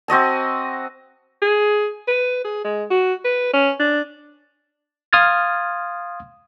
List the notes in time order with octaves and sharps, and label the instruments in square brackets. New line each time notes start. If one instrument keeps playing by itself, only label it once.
[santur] C4 F#4 D#5 A5
[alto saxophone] G#4
B4
G#4
G#3
F#4
B4
C#4
D4
[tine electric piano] F5 C6 D#6 F6 G#6 A6